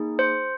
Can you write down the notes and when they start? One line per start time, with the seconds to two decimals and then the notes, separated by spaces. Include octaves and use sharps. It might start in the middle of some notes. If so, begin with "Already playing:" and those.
Already playing: A#3 D#4 G#4
0.19 C5